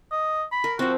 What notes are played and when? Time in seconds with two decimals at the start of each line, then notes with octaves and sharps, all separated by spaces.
0.12 D#5
0.52 B5
0.64 A#4
0.79 F3 C4 F#4